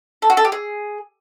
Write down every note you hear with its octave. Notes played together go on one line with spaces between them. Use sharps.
A4
F#4
A4
G4
G#4